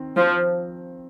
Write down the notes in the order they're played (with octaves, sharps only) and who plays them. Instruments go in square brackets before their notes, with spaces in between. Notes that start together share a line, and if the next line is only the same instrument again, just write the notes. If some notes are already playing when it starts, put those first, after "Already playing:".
Already playing: [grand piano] D#3 C4
[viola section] F3